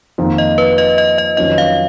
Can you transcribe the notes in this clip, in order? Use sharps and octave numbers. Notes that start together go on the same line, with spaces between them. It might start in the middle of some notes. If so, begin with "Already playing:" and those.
F2 D#3 A#3
D#5
B4
D#5
D#5
D#5
F2 D#3 F#3 C#4 F4 D#5
F5